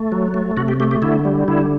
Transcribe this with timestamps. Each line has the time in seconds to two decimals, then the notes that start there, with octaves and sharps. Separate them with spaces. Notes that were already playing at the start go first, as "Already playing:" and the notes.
Already playing: A3
0.12 F#3
0.34 A3
0.57 C3 F#4
0.68 G4
0.80 A3 G4
0.91 G4
1.02 D3 E4
1.25 G3
1.48 D3 E4